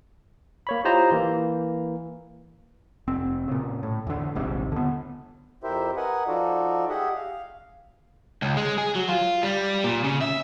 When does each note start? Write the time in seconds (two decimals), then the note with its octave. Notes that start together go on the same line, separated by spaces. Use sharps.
0.67 A#3 C#5 B5
0.85 E4 F4 G4 C5 D#5 A#5
1.12 E3 A#3
3.08 F1 C4
3.48 A#2 C#3
3.83 A2
4.07 E2 D3
4.35 D#1 A#1 G#2 C3
4.72 D3 B3
5.64 F2 E4 G4 A#4 C5 E5
5.97 A#4 B4 D#5 F#5 G#5
6.28 F3 D#4 F4 F#4 A4 D5
6.89 G4 G#4 D#5 E5 F#5
7.15 F5
8.42 C#2
8.57 G#3
8.78 G#4
8.95 F#3
9.09 F4
9.43 G3
9.84 A#2
10.04 C#3
10.21 E5